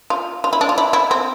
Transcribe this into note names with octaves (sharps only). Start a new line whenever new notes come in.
F4
F4
E4
D4
F4
E4
E4
C4